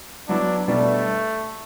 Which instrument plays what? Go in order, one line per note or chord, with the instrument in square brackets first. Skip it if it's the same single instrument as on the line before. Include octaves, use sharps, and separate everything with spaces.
[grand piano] F#3 B3 E4 [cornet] D4
[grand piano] B2 G3 D4 [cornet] A3